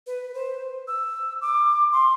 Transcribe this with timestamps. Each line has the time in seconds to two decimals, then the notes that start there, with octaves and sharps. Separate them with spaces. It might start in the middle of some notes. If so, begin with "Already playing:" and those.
0.07 B4
0.34 C5
0.88 E6
1.41 D6
1.92 C6